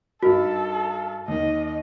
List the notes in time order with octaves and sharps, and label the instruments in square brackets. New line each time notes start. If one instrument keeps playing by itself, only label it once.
[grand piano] G2 D#4 A#4 [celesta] F#4 [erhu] A4
[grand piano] D#2 D#3 [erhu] D#5